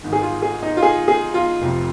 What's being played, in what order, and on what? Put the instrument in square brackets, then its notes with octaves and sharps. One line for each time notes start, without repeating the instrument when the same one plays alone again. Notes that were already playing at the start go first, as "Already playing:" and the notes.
[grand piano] G#1 G#2 D#3
G#4
F4
G#4
D#4
F4
G#4
G#4
F4
F1 F2 C3 F3